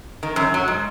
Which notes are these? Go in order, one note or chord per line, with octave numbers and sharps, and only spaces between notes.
D#3
F#2
F#3
G#2